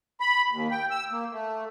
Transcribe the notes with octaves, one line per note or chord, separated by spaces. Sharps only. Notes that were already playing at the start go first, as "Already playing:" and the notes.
B5
D#2
G5
E6
A#3
A3